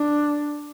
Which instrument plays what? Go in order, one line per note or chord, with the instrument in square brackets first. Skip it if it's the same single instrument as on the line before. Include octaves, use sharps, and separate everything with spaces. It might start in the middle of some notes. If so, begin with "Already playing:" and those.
Already playing: [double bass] D4